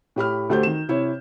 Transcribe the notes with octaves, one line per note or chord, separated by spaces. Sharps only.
A2 G4 B5 F6
D2 A3 G4 C5 G6
D#3 E7
C3 E4 C#5